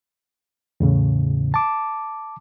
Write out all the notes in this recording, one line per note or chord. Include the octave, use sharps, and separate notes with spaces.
E2 A2 C#3
A5 D6